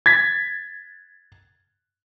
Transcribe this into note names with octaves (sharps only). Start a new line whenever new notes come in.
G#6 A6 B6